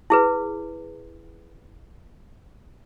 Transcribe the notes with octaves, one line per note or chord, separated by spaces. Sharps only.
E4 G#4 B4